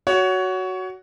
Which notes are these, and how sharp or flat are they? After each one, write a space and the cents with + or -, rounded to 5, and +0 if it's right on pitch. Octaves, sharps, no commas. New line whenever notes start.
F#4 +5 C#5 +20